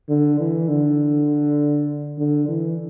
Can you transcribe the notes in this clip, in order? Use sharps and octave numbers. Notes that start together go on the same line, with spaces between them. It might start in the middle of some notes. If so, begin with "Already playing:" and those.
D3
E3
D3
D3
E3